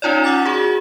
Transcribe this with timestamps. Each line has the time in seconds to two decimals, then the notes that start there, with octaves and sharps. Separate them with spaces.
0.02 C#4 D#4 F4 C#5 D5
0.24 F#5 D6 A6
0.45 F#4 G#4